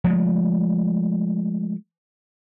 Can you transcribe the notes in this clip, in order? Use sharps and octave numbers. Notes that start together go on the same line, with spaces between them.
F3 G#3 A3